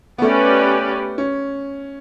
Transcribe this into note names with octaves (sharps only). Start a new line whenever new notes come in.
B3
A3 C#4 G4 B4 D5
C#4